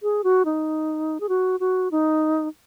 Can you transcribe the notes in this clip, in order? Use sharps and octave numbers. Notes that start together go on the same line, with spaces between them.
G#4
F#4
D#4
G#4
F#4
F#4
D#4